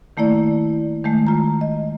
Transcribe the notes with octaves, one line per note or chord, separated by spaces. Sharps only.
D#3 A3 A#3 E4 D5
D#3 G#3 A3
F4 A#5
D#5